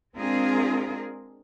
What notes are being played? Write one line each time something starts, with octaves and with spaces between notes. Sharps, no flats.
G#3 C4 D4 F4 G#4 A#4